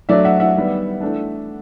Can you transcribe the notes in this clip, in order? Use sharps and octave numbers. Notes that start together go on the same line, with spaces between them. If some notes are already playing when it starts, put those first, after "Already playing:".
F#3 A3 D4 D5 E5
E5 F#5
E5 F#5
D#3 G3 B3
E3 A3 D4